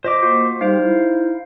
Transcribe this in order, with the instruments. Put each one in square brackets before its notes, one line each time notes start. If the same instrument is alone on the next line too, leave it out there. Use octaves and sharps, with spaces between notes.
[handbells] F4 D#5 [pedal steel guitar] C5 D6
[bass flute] A#3 [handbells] F4 F#4
[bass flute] G3 [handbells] D#4 C5 [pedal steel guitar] F5
[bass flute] E4